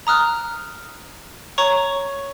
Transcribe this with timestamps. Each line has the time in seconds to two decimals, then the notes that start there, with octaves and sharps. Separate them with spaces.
0.07 A#5 D#6 F6 F#6
1.58 C#5 A#5 C#6